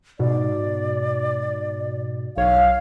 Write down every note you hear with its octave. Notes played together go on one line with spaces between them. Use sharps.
G#2 B2 D5
B1 C#5 F5